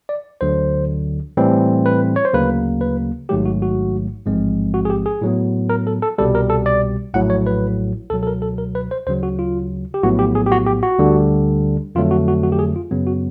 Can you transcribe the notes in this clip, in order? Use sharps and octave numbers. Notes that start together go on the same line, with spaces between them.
D5
D2 D3 F#3 C5
A2 E3 G3 C4
B4
C#5
C5
D2 C#3 F#3 A#3 B4
B4
A1 G#2 D#3 F#3 A3 G4
F#4
F#4
A1 G#2 F3 G#3 C4
F#4
G#4
G4
G#4
A2 F#3 B3
A#4
A4
A4
C2 B2 G3 A4
A#4
A4
D5
A#1 A2 F#3 F#5
C#5
B4
C#2 B2 F#3 A4
A4
A#4
A4
A#4
B4
C5
D2 C#3 F#3 C5
F#4
F4
G4
A#1 A2 F#3 B3 F#4
G4
G#4
G4
F#4
G4
F#4
D2 D3 G3
F2 D3 F#3 A3 F4
F#4
F#4
F#4
G4
G#4
F4
F#2 C#3 F#3 B3
F#4